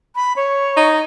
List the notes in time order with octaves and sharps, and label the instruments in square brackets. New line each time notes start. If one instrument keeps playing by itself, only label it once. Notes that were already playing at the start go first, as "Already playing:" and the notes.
[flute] B5
C#5
[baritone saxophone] D#4